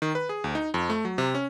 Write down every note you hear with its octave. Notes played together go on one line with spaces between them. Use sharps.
D#3
B4
G#4
D2
D#4
F2
A3
F#3
C3
C#4